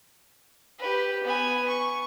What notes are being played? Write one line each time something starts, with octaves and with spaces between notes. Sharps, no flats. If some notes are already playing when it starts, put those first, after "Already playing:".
G4 B4
B3 G#5
C#6